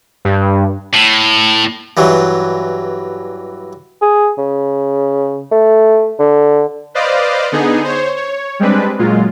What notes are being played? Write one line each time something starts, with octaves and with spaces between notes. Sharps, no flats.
G2
A2
G2 E3 F#3
G#4
C#3
A3
D3
B4 C5 D5 D#5 F5
D3 B3 D#4 G#4
C5 C#5
C#5
G3 G#3 C4 D4 B4
A#2 F#3 G#3 F4